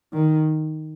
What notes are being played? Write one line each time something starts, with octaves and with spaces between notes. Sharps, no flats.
D#3